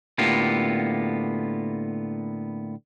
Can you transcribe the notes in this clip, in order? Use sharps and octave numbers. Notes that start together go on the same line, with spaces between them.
A2 D3 A#3 B3 F4 G4